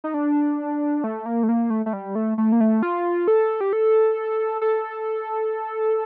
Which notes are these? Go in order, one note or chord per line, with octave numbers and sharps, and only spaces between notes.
D#4
D4
A3
A#3
A3
A#3
A3
A3
G3
A3
A3
A#3
A3
F4
A4
G4
A4
A4